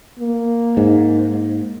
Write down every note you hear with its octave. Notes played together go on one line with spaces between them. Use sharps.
A#3
G#2